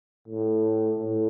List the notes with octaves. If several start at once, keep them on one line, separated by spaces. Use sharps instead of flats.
A2
A2